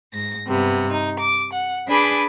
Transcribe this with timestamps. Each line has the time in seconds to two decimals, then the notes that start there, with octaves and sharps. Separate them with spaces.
0.12 G#2 A#6
0.47 G2 C3 B3
0.90 D#4
1.19 D6
1.52 F#5
1.87 D4 G#4 B4 G#5 B5 D6